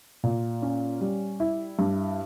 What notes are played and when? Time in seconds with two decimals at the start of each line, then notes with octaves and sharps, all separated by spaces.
0.23 A#2
0.62 C#4
1.01 G3
1.40 E4
1.79 G2